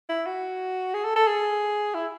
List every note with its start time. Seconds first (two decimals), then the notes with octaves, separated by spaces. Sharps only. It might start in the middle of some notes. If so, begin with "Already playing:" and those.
0.09 E4
0.26 F#4
0.94 G#4
1.05 A4
1.16 A4
1.27 G#4
1.94 E4